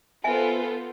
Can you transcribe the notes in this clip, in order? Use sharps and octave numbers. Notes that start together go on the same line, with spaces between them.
B3 F4 A4 C5 E5 G#5